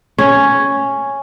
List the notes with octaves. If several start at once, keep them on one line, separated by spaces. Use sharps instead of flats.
C#4